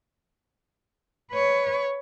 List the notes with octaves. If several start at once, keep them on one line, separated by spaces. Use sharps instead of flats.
B4 C#5